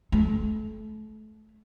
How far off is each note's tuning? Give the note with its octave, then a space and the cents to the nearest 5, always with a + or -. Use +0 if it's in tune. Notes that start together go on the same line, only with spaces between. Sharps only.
A3 -30